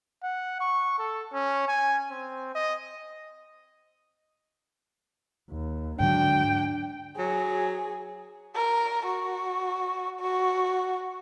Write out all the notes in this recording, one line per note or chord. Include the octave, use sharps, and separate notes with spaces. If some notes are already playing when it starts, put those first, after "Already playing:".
F#5
C#6
A4
C#4
G#5
C4
D#5
D#2
G#2 D3 F#3 D4 G5
F#3 G#4
A#4
F#4
F#4